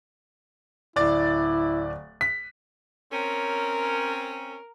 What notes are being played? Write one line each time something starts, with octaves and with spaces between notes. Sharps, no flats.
D1 E4 D5 A6
B6
C4 C#4 A#4